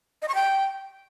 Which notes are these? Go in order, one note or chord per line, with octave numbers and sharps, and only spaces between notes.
D#5
C#6
G5